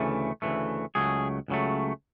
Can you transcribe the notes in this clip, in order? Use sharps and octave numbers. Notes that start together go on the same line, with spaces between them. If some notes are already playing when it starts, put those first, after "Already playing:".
Already playing: D2 C#3 E3 A3
D2 C#3 E3 A3
C#2 C#3 F#3 A3 G#4
C#2 C#3 F#3 A3